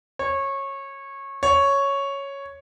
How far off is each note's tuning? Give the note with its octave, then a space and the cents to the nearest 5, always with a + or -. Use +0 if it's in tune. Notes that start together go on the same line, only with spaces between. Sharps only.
C#5 -20
C#5 +0